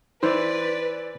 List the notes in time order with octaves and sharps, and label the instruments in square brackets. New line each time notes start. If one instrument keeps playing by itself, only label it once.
[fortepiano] E3 [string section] B4 [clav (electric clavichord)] C5 [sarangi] D5